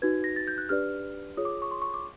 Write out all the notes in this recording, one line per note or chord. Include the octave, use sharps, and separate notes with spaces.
D#4 F#4 B4 G#6
A#6
A6
G6
F#6
D4 G4 B4 D5 F6
F4 G#4 C#5 D#6
D6
C#6
C6
C#6
D6